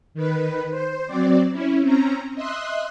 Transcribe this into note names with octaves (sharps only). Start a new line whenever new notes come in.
D#3 B4
C5
F#3 C4 D5
C#4 E4
C4 C#4 A#5
D#5 E5 C6 F#6